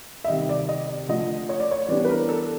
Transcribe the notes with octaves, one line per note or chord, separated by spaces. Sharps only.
E5
C3 D#3 G3 D#5
D5
D#5
D5
D3 F3 A3 D#5
C#5
D5
C#5
E3 G3 B3 D4 D5
B4
A#4
A4